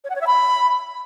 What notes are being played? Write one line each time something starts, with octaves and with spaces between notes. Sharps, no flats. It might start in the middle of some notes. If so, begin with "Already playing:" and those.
C#5
F#5
C#5
E5
B5